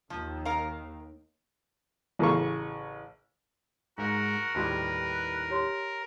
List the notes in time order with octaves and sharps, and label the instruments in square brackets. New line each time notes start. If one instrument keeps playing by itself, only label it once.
[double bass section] D#2 D#3 [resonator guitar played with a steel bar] F3
[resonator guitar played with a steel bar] A#4 F5 A#5
[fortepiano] A1 C#3 A4 A#4 F5 C#6
[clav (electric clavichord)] G#2 [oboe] F#4 [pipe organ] A#4 [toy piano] F5
[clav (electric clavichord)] D#2 A2 G3 [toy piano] F#4 A5 [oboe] B4
[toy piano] G4 C#5 C6